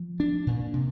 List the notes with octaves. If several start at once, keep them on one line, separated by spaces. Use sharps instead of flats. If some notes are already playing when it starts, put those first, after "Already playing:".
Already playing: F3
D4
A#2
C3